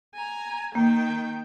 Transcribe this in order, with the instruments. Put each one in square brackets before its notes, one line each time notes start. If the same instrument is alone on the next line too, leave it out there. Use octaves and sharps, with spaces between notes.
[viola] G#5 A#5
[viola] D#3 G5 [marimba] A#3